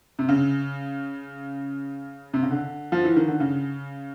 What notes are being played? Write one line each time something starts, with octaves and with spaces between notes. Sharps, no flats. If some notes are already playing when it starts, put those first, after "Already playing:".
C3
C#3
C3
C#3
D3
F3
E3
D#3
D3
C#3